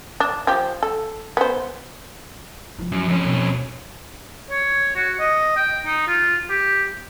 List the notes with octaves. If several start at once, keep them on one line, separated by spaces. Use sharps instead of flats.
D4
F3 G4
A4
B3 C5
F3 E4
F#2 F#3
F2 C#4
D#2 B2
C#5
F#4
D#5
G5
D#4
F4
G4